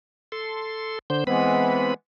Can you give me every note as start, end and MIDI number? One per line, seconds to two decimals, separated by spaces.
0.32 0.99 69
0.32 0.99 84
1.10 1.24 50
1.10 1.24 72
1.10 1.24 91
1.27 1.92 52
1.27 1.92 56
1.27 1.92 59
1.27 1.94 60
1.27 1.94 71
1.27 1.94 83